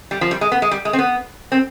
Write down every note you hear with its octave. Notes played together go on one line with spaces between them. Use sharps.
G3
F3
G3
G#3
B3
G#3
G3
G#3
C4
B3
C4